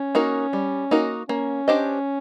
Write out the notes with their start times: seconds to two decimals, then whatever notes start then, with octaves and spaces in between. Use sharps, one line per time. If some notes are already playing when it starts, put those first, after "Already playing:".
Already playing: C#4
0.15 A#3 D#4 F#4 A#4
0.53 G3
0.91 A#3 D#4 F#4 A#4
1.29 A#3 C#4
1.68 D4 G4 C5 D#5